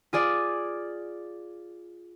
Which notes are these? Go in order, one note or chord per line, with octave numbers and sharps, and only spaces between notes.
F4 G#4 D5